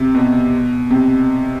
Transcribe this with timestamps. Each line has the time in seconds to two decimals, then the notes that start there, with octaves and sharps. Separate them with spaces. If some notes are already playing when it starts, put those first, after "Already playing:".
Already playing: C3
0.15 B2
0.91 C3